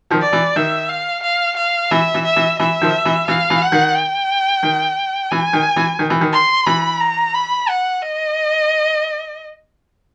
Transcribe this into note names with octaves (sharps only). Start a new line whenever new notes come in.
D#3 F3
D5
E3
D#3 E5
F5
F5
F5
E3 E5
E3
E5
E3
E3 E5
D#3 F3
E3
E3 F5
E3
F#5
D#3
G5
D#3
E3 G#5
D#3
E3
D#3
E3
D#3
C6
E3 B5
A#5
B5
F#5
D#5